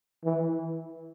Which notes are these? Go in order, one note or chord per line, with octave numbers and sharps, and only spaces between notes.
E3